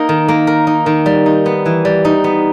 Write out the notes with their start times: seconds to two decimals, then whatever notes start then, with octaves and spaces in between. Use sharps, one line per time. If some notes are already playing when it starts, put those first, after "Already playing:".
Already playing: A#3 D#4 A#4
0.09 D#3
0.28 A#3
0.47 A#4
0.67 D#4
0.86 D#3
1.06 G3
1.26 D#4
1.46 B3
1.66 E3
1.85 G3
2.05 D#4
2.24 B3